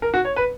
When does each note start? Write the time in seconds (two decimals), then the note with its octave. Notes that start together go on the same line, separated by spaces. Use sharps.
0.02 A#4
0.14 F#4
0.25 C#5
0.36 B4